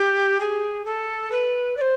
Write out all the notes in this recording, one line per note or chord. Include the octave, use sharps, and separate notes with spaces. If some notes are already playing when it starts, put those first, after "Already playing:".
Already playing: G4
G#4
A4
B4
D5
C5